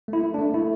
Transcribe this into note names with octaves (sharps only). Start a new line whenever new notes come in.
A3
E4
A3
D4
A3
A3 E4